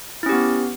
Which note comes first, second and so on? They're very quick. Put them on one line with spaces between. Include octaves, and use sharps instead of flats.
E4 C#4 G4 B3